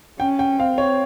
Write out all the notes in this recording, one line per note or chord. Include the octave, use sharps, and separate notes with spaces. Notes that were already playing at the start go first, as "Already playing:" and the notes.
C#4 G5
G5
C4 F5
C#5